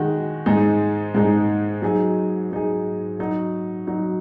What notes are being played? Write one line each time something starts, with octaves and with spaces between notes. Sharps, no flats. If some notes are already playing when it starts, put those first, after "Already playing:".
Already playing: D#3 G#3 F#4
G#2 G#3 D#4 G#4
G#2 G#3 D#4 G#4
F#3 D#4 G#4
F#3 D#4 G#4
F#3 D#4 F#4
F#3 D#4 F#4